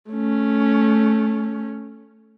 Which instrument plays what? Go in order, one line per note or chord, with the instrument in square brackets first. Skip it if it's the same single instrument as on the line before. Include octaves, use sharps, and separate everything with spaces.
[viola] A3 C#4